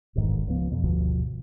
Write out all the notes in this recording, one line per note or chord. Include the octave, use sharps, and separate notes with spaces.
E1 A1 G#2 D#3
C#2 F3 B3
F2 B2
G1 D2 B2 F3